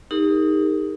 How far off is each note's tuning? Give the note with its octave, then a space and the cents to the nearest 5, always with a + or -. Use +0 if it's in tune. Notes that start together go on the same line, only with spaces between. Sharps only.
D#4 +10 G4 +40 A#4 -40